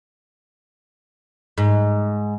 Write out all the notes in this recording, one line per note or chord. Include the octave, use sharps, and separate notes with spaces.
G#2